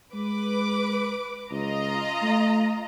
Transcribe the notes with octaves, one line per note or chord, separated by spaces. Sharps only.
G#3 B4 D6
C#2 F4 D#5 A#5
A3